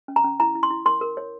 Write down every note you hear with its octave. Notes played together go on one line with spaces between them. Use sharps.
C#4
A#5
C#4
E4 A#5
E4
C6
E4
A#4 C6
A#4
C#5